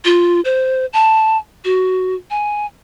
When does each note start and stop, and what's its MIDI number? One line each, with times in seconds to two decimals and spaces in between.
0.05 0.41 65
0.45 0.86 72
0.93 1.37 81
1.65 2.15 66
2.30 2.66 80